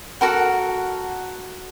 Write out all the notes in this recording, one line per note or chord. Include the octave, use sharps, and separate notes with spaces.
F#4 A4 A#4 F#5